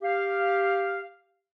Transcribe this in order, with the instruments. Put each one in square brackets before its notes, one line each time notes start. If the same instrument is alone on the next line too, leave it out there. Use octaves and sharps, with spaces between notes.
[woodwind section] G4 F5